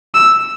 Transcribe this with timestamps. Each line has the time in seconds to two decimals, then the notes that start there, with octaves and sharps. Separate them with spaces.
0.14 E6